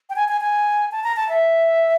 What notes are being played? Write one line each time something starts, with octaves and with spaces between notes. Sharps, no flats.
G5
G#5
G#5
G#5
A5
A#5
A5
E5